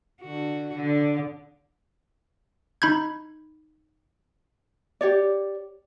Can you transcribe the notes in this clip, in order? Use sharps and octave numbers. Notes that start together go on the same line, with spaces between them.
D3 F#4
D3
D#4 B5 G6 G#6
G4 C#5 D5